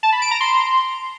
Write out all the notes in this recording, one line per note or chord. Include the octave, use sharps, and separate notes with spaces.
A5
B5
D7
A#5
C6